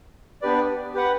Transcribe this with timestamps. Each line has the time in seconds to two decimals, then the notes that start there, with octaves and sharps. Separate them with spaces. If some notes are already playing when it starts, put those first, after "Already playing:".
0.42 B3 D4 G4 B4 D5
0.94 G4 B4 F#5